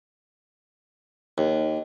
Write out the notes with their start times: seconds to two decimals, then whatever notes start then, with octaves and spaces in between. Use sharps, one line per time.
1.38 D#2